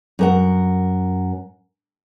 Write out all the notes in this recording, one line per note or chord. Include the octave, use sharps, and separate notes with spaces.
F#2 A#4 F#5